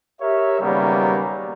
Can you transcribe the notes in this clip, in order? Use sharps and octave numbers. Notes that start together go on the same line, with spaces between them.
G4 A#4 C#5 E5
D#2 C#3 F#3 G3 A#3 B3